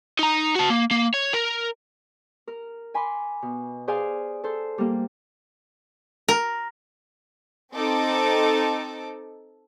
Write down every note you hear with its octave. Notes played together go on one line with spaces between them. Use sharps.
D#4 A#5
F#4 A5
A#3
A#3
C#5
A#4
A#4
G#5 B5 C6 D6
B2
G#4 C5 D5 F5 G#5
A4 C5
G3 A#3
A#4
C4 D#4 A4 D6